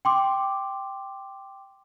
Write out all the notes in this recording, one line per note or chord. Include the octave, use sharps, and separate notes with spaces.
G5 C6 D6